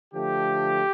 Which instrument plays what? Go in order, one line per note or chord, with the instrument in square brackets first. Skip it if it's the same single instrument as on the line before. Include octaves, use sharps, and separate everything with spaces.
[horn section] D3 F3 A3 G4